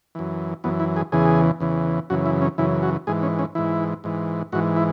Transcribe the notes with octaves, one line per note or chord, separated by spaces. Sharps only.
F#2 E3
F#2 E3 B3
E4
G#4
E2 C#3 E3 G#4
E2 C#3 E3
F#2 C#3 E3 F#4
E4
C#4
F#2 C#3 E3 E4
F#4
G#2 E3 G#4
C#4
C#4
G#2 E3 E4
G#2 E3
G#2 E3 F#4
E4